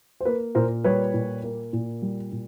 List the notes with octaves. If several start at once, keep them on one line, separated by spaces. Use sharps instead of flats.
C5
A#3 B4
A#2 A#4 C5
G3 B4 C#5
A#2
A#3
A#2
G3
A#2